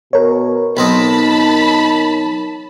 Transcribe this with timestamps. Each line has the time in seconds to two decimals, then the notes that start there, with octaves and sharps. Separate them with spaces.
0.13 B2 A#4 C#5
0.77 B1 C4 D#4 D#5 A5 B5